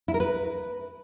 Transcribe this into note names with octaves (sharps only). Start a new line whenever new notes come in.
E4
A#4
B4